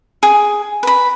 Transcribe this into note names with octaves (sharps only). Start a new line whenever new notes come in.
G#4
B4 B5